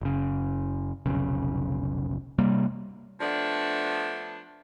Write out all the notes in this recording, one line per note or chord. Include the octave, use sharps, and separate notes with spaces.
F#1 C#3
F1 B1 C#3
C3 G3 A#3
F3 A3 B3 D4